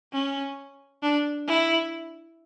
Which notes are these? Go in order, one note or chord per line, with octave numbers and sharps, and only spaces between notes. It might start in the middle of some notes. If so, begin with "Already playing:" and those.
C#4
D4
E4